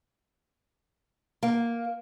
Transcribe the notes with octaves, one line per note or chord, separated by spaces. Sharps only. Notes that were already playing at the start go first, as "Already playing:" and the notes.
A#3